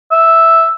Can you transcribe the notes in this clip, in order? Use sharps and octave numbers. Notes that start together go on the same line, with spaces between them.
E5